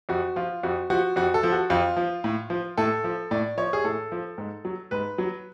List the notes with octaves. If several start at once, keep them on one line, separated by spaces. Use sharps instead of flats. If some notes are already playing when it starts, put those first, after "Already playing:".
F2 F#4
F3 F4
F2 F#4
F3 F#4
F2 F#4
A4
F3
F#4
F2 F4
F3
A2
F3
A2 A4
F3
A2 D5
F3 C#5
G#4
A2 A4
F3
G#2
F#3
G#2 B4
F#3